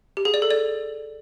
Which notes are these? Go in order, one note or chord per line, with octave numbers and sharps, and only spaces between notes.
G4
G#4
D5
A4
D5